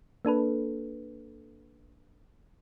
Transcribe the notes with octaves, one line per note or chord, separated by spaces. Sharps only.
A#3 D4 A4 B4